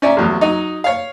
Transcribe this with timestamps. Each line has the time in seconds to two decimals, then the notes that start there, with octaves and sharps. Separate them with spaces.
0.02 C#4 D5 E5 A#5
0.17 A1 E2 F#3
0.41 F#3 D#4
0.84 C#5 F5